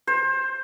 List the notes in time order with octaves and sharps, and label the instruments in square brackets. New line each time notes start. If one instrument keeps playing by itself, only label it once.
[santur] C5